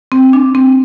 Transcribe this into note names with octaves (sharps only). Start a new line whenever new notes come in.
C4
D4
C4